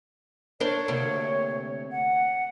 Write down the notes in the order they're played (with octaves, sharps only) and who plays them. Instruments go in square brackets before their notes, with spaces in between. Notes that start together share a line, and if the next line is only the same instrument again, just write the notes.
[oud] D4 A#4 C5 [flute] C#5
[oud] D2 C3 A#3
[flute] F#5